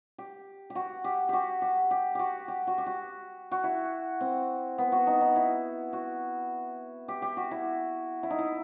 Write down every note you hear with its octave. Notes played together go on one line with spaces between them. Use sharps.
G4
G4
F#4
G4
F#4 G4
G4
G4
F#4 G4
G4
F#4
G4
F#4
F#4
E4
C4
B3
F#4
D#4
D#4
E4
F#4
G4
G4
F#4
E4
E4
D#4
E4